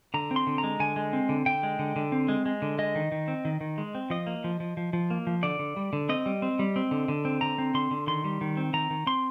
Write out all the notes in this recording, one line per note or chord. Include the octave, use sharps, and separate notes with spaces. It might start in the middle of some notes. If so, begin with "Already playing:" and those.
D3 A#5
C4
C6
D3
A#5
G#3
D3 G#5
G#3
C4
D3
D3 G5
G#3
D3
D3
C4
G#3
G#3
D3
G#3 D#5
D#3
D#3
C4
D#3
D#3
G#3
C4
F3 D#5
A#3
F3
F3
F3
F3
A#3
F3
D3 D5
D3
G3
D3
C4 D#5
G3
C4
G3
C4
D3
D3
C4
D3 A#5
C4
D3 C6
D3
D#3 C6
G3
D#3
C4
D#3 A#5
D#3
C4 C6